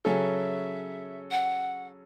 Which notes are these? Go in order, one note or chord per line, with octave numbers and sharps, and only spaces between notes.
C#3 F#3 C#4 F#4 A4 E5
F#5